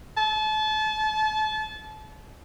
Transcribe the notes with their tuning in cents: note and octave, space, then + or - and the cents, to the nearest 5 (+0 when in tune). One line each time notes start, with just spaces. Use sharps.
A5 -30